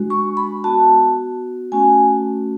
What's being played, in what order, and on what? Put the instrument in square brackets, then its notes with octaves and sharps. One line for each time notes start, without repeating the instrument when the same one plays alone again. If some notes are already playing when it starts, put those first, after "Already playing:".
Already playing: [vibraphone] G#3 D4 F#4
C#6
B5
B3 F#4 A5
A3 C#4 F#4 G#5